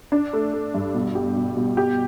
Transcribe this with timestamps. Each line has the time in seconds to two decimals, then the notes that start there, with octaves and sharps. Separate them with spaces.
0.12 D4
0.33 A3
0.54 A3
0.74 G2
0.95 B2
1.15 G4
1.36 B2
1.57 B2
1.77 G4